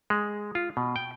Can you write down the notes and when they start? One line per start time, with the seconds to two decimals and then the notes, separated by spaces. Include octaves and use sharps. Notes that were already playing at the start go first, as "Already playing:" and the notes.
0.10 G#3
0.55 F4
0.77 B2
0.96 G5